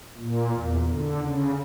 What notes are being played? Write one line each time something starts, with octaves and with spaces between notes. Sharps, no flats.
A#2
E2
D3
C#3